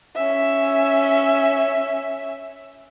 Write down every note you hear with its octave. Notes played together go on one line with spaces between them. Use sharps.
C#4 E5